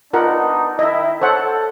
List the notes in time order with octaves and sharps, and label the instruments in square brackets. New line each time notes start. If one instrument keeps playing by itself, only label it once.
[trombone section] B3 D4 D#4 [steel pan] F4 A#4 F#5
[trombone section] D#3 E4 [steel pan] D#5 E5
[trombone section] A4 [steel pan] C5 C#5 F#5